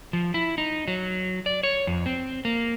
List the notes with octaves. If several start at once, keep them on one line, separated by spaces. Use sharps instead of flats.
F3
E4
D#4
F#3
D5
C#5
F2
C4
A#3